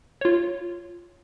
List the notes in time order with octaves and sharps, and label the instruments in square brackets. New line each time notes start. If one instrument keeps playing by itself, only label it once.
[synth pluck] F4 C#5